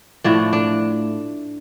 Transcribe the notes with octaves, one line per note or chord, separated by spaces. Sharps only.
A2 F3 A3 D4
D4